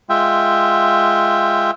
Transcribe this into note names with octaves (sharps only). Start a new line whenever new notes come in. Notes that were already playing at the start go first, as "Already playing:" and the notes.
G#3 F4 E5 G5